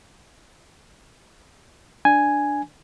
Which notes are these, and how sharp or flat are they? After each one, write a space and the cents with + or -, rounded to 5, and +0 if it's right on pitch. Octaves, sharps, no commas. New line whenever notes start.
D4 +0 G#5 +0